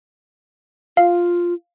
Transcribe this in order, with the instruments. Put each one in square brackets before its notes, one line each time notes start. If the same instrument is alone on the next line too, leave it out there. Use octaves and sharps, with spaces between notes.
[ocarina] F4 [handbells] F5